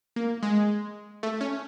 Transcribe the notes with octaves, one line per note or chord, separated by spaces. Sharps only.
A#3
G#3
A3
C#4